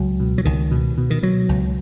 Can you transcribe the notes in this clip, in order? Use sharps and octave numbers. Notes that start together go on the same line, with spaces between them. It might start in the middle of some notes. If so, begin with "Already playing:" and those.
Already playing: C#2 F#3
B2
F#3
C#2 D#3
B2
B2
D#3
B2 F#3
C#2